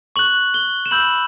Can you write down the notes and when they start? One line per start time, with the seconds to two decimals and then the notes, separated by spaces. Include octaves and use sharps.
0.16 C#6 F#6 F#7
0.54 G7
0.86 E7
0.91 B5 E6 G6 F#7